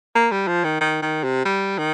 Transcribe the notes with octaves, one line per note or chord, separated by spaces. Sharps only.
A#3
G3
F3
D#3
D#3
D#3
C3
G3
D#3